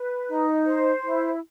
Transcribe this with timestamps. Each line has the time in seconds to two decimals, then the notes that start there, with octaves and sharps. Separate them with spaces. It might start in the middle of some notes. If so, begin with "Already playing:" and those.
Already playing: B4
0.28 D#4
0.66 C5
1.04 E4